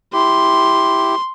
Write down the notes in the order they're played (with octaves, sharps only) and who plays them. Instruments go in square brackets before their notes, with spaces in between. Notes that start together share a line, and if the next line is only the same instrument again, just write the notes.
[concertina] E4 G4 [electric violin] C6